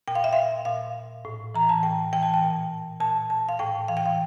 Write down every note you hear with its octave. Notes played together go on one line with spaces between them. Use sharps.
A#2 G5
F5
E5
F5
A#2 F5
A2
E3 A#5
A5
A2 G5
E3 G5
A5
G5
A#2
A#2 A5
A5
F5
A2 G5
E3 F5
G5
F5